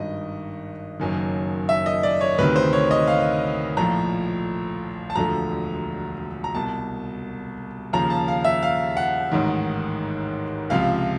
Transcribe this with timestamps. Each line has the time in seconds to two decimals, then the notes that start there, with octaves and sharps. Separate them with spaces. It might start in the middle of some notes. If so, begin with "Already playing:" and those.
Already playing: G#1 G2 D#3 D#5
1.00 F#1 F#2 D#3
1.69 E5
1.86 D#5
2.03 D5
2.21 C#5
2.38 D2 C3 D#3 B4
2.56 C5
2.73 C#5
2.91 D#5
3.07 F5
3.77 A#1 A2 F3 A#5
5.10 A5
5.15 E1 D2 D3 F3 A#5
6.44 A#5
6.54 C2 B2 A5
7.93 D#2 C#3 F3 A#5
8.10 A5
8.28 F5
8.44 E5
8.63 F5
8.97 F#5
9.32 A1 G#2 D#3
10.70 C#2 C3 F3 F5